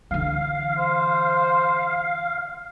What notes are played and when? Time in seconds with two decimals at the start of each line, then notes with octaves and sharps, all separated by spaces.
0.11 D3 E3 F5
0.78 C5